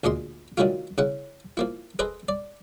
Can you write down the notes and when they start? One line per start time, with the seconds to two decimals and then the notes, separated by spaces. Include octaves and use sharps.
0.04 D2 A#2 G#3 D#5 C6
0.58 D#3 F#3 G3 A3 E4 F4
0.98 C#3 E4 F#5
1.57 F3 A#3 E4
1.99 G#4 A4 B4 C5 D#5
2.29 D5